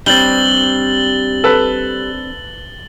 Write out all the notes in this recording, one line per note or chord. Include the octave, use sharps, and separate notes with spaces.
G3 C4 D4 A6 F#7 G7
A4 B4